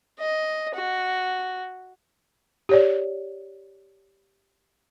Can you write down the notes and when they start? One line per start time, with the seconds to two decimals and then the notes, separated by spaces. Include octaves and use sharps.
0.19 D#5
0.74 F#4
2.69 G4 C#5 D5